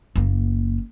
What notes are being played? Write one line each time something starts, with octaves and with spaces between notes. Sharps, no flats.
F#1 A#3